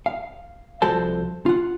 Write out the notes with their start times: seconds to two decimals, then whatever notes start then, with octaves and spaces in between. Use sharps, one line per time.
0.06 F5
0.82 C2 F3 F#4 A4 C5 A5
1.46 F4 F#5